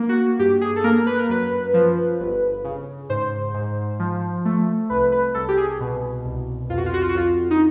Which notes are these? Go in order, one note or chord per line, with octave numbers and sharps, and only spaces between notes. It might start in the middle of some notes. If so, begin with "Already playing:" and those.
Already playing: A#3
F#4
G2 G4
G#4
A4
A#3 A#4
B4
A#4
F#2 B4
F3
G1
C#3
G#2 C5
G#2
F3
A3
C2 B4
B4
C2 A4
G4
G#4
B2
C2
F2 F4
F#4
F4
F#4
F4
F#4
F2 F4
D#4